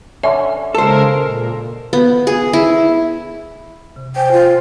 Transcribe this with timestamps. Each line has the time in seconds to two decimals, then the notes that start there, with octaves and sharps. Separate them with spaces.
0.23 D3 C#4 E5
0.75 C#3 G#3 A4 A#4 C5
1.21 A#2
1.93 B3
2.27 G#4
2.53 E4
3.96 C3
4.16 C5 G5 G#5
4.32 F4